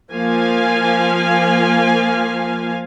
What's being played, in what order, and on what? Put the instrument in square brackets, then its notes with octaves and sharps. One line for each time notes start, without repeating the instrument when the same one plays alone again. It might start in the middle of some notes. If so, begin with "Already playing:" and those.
[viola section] F3 A#3 F5 G#5